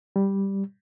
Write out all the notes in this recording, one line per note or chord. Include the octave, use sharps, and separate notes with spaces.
G3